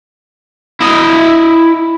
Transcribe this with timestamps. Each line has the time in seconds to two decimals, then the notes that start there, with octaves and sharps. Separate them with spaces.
0.81 E4 D#5